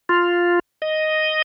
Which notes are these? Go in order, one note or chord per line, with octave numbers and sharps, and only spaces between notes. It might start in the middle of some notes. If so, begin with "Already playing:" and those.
F4
D#5